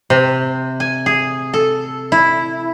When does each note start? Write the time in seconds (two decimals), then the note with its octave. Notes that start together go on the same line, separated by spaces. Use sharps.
0.10 C3
0.80 G#5
1.06 G#4
1.54 A4
2.12 E4